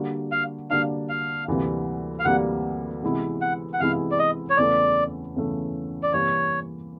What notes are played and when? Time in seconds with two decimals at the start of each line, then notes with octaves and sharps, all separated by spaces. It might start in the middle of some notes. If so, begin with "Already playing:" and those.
Already playing: D3 G3 A#3 D4 F#4
0.32 F5
0.70 D3 G3 A#3 D4 F#4 F5
1.09 F5
1.48 D2 C3 E3 G3 A#3
2.19 F5
2.25 D2 C3 E3 G3 A#3 F#5
3.03 C3 E3 G#3 B3 E4
3.42 F#5
3.74 F#5
3.80 C3 E3 G#3 B3 E4 F5
4.11 D5
4.19 D#5
4.50 C#5
4.57 E2 C#3 E3 A3 D5
5.36 E2 C#3 E3 A3
6.03 D5
6.13 C3 E3 G3 A#3 C#5